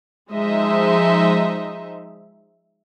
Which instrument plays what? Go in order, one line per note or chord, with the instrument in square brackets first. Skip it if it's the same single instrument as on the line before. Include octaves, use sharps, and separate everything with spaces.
[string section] F3 G#3 D#4 C5 D#5 E5